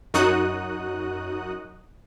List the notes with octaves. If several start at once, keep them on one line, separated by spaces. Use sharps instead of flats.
F#2 D#4 F#4 D#6 F#6